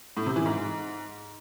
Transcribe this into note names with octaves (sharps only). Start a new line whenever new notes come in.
A2
C3
E3
G#2